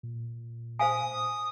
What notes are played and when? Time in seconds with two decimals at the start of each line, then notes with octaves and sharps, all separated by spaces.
0.03 A#2
0.79 C5 F5 G#5 D#6